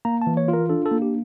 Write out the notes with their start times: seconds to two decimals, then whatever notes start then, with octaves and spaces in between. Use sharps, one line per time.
0.05 A#3 A#5
0.22 A5
0.27 E3
0.37 C#5
0.48 F4
0.53 A#4
0.69 D4 A4
0.86 A4
0.91 A#3
1.02 G4